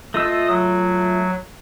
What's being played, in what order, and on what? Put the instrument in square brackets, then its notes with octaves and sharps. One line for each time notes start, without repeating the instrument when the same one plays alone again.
[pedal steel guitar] A3 F4 E6 [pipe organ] D#5 D#6
[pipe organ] F#3